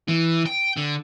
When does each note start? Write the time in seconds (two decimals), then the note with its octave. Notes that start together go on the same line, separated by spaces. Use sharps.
0.08 E3
0.46 G5
0.77 D3